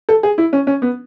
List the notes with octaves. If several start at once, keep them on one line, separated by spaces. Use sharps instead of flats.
A4
G#4
E4
C#4
C#4
B3